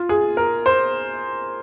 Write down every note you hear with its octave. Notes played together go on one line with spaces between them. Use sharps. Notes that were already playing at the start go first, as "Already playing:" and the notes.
Already playing: F4
G#4
A#4
C5